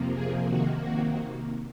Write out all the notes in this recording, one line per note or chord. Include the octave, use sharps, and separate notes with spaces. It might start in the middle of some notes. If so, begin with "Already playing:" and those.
Already playing: F2 C3 F3 A#3
G#4
C3 D#3 A#3 F#4
F#4